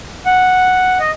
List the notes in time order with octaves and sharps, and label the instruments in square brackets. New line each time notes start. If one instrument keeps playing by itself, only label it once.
[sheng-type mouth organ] F#5
D#5